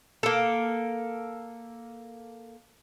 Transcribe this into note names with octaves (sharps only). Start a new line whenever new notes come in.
A#3 A4